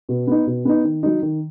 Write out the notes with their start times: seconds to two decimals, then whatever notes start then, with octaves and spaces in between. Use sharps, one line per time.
0.09 B2
0.27 B3 D#4
0.47 B2
0.65 B3 D#4
0.84 D#3
1.03 F#3 D#4
1.22 D#3